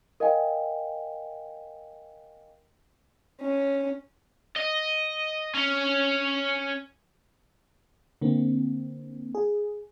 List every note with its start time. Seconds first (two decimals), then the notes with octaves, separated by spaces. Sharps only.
0.20 A#4 D#5 F5 G5 G#5
3.41 C#4
4.57 D#5
5.55 C#4
8.21 D3 A#3 C4
9.35 G#4